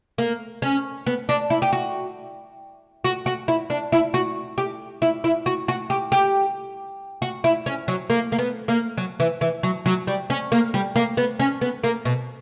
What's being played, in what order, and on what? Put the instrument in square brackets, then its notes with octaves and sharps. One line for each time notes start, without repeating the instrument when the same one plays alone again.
[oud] A#3
C#4
B3
D4
E4
G4
F#4
F#4
F#4
E4
D4
E4
F#4
G4
E4
E4
F#4
F#4
G4
G4
F#4
E4
C#4
F#3
A#3
A#3
B3
A#3
F#3
E3
E3
F#3
F#3
G3
C#4
A#3
G3
A#3
B3
C#4
B3
A#3
B2